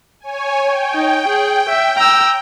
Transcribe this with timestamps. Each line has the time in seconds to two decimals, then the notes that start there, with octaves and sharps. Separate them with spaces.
0.20 C#5 G#5
0.64 G5
0.95 D#4
1.28 G#4
1.69 E5
1.99 A#5 E6